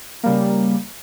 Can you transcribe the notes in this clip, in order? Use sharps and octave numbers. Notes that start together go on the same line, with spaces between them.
C#3 G3 A#3